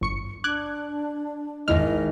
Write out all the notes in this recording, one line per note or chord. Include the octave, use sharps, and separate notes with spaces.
G1 C#6 C#7
D4 D6 F#6 G#6
G#1 E2 E4 D#5 F6